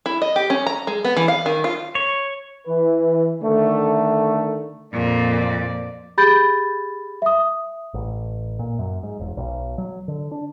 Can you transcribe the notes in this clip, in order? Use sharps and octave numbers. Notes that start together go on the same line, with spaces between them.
E4
D#5
G4
C#4
A#5
G#3
B3
E3
F5
D#3
F4
C#5
E3 B4
D3 D#3 A3
F2 A#2 D5
G4 G#4 B5 G6 A6
E5 D#6
A1
A#2
F#2
G#2
E1
B1
F#3
D3
D4